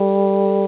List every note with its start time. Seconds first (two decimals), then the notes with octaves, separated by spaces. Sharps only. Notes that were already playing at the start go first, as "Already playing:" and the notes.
Already playing: G3 A4